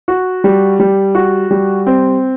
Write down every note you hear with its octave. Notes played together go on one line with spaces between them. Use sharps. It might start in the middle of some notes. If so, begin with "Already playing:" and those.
F#4
G3
G3
F#4
G3
C4